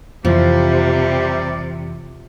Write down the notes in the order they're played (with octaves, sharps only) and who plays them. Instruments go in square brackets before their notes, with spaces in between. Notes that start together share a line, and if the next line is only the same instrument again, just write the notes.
[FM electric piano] F2 E3 [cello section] C3 [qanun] F3 [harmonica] G3 D5